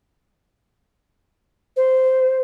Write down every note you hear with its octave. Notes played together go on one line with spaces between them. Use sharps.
C5